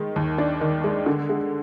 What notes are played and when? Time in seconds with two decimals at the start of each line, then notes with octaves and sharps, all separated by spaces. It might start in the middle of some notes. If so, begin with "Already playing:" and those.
Already playing: D#3 G#3
0.16 D#2
0.38 D4
0.61 D#3
0.84 G#3
1.06 D3
1.29 G#3